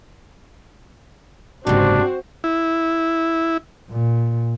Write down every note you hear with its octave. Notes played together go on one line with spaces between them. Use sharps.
F#1 G#2 C3 C4 D4 F#4 C5
E4
A#2